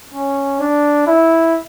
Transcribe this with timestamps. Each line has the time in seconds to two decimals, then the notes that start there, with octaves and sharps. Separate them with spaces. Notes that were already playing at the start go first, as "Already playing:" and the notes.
0.13 C#4
0.60 D4
1.07 E4